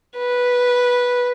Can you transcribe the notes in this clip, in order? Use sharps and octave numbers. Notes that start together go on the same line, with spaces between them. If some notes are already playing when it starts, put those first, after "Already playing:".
B4